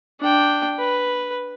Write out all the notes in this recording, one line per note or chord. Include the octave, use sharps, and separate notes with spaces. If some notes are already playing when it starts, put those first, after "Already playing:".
D4 G5
B4